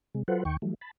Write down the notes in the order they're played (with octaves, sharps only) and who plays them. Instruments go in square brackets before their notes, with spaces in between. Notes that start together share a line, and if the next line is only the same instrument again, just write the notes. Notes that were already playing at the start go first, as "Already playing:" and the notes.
[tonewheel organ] C3 G#3
F#3 F4 A4 B4 C5 F#5
D#2 D#3 G5 C#6
E3 F#3 G3 A3
A5 B5